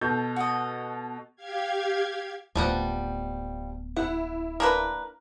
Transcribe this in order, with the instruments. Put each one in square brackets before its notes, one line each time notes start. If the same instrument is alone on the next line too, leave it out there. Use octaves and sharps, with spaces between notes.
[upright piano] B2 A4 G6
[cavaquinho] F#4 D#5
[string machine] G4 F5 G#6
[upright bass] D1 B3 [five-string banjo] F3 G3 F#5
[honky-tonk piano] E4 [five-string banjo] F#5
[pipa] A#3 D4 B4 [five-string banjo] A#4